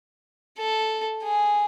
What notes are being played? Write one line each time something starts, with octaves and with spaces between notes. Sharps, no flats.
A4
G#4